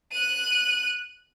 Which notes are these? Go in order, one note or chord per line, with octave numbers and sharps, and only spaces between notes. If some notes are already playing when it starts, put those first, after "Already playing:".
F#6 D#7